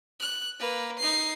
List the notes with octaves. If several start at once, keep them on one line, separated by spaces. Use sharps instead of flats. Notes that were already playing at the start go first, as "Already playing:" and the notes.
F#6
A#3 B4
D#4 C7